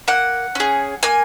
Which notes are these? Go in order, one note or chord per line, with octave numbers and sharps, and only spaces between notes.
A#3 F#5
C#4 G#4
A#3 G#5